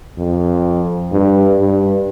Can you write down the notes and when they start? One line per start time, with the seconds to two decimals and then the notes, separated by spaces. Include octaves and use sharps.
0.18 F2
1.12 G2
1.59 G2